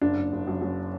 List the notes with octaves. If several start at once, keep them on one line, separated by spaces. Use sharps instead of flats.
F#1 D4
F#1
F#1
F#2
F#2